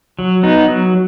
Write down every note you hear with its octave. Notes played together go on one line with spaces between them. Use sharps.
F#3
B3 D#4
F#3